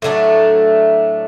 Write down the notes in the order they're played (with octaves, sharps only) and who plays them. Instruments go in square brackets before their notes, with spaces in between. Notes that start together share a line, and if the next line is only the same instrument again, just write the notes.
[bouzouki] A2 F#3 A3 D4